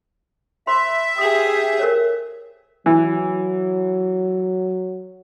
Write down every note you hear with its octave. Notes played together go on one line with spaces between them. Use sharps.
C5 E5 B5 C6
G4 G#4 D#6
A#4 C5 C#5
E3 F#3